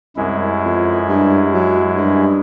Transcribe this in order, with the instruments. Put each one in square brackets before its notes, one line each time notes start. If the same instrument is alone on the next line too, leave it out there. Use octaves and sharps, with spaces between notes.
[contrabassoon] C2 [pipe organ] F#2 G#3 E4
[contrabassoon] F2
G2
F#3
G2